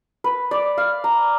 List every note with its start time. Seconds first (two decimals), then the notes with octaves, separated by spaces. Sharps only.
0.24 B4
0.51 D5
0.78 F5
1.04 A#5